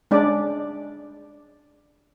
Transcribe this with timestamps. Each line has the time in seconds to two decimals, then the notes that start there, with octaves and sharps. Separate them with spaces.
0.11 G#3 C#4 D4 D5